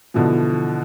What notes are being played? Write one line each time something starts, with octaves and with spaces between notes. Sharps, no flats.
B2 D3 E3 F3